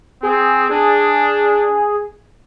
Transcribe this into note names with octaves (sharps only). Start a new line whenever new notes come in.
C4 G#4
D4 G#4